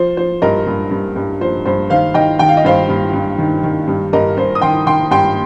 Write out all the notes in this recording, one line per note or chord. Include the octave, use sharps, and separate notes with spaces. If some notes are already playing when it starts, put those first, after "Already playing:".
Already playing: F3 C5
F3 C5
G2 A#4 D#5
G2
G2
G2
F3 C5
G2 C5
D#3 C5 F5
D#3 D#5 G5
D#3 G5
F5
D#5
G2 C5 F5
G2
G2
D#3
D#3
G2
G2 A#4 D#5
G2 C5
D#6
D#3 G5 C6
D#3 G5 C6
G2 G5 C6